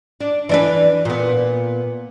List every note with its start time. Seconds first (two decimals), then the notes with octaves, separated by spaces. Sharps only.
0.21 D4
0.49 E3 D4 B4
1.05 A#2 B3